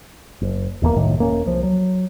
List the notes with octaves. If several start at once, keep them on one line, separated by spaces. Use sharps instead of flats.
F#1
D#1 E2 F3 A#3
F#1 C2 A2 D#3
E1 A#3 C#4
C2 F3
F#3